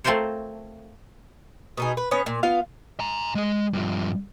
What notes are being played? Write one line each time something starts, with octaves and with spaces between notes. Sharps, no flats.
A3 C4 F4 A#4 C5 C#5
B2 D#4 G#4
B4
B3 C#4 C#5
A#2
B3 F4 F5
G#5 A#5
G#3 D#5
G2 F3